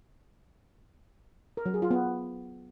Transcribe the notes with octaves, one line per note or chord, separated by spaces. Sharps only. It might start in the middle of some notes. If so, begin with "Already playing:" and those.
A#4
F#3
G#4
F4
B3